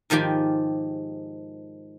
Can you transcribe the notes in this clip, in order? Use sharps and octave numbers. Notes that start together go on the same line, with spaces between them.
G#2 D#3 F3 G4 G#5